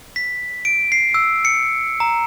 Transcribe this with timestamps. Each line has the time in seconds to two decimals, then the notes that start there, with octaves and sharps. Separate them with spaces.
0.16 B6
0.65 D7
0.92 C7
1.14 E6
1.45 C#7
2.00 A#5